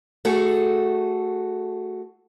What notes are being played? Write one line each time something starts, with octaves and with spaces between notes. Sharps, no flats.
A3 F#4 G#4 A4